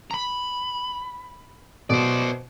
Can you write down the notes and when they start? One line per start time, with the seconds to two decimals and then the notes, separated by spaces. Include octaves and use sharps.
0.11 A#5 B5
1.90 B2 C5 D5